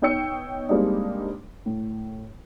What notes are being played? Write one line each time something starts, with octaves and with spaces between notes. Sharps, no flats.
B3 D#4 C#5 G5 E6 C#7
G3 G#3 A#3 C4 D4 D#4
A2